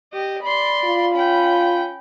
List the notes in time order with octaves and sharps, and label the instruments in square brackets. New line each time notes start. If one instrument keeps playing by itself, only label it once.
[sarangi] G4 [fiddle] D#5
[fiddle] D5 C6 [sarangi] B5
[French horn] F4
[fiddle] C#4 G5 [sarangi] B5